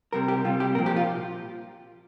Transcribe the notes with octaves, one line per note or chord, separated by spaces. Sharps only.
C3 G3 A#4
G4
C3 G3 F4
G4
A#2 F3 A#4
G4
F4